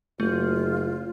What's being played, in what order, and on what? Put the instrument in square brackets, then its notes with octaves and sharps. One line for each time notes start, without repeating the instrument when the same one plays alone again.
[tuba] F#1 [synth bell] A3 [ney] F4